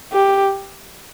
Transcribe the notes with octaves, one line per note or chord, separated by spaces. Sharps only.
G4